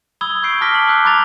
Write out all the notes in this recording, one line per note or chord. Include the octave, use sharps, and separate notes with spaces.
B5 D#6 E6 G#6 G7
C#6 G6 C7 D7
A5 D6 F6 A#6 B6 G7
A#6 F#7
D6 E6 F#6 G6 F#7
A#5 C6 D6 G6 A6 F7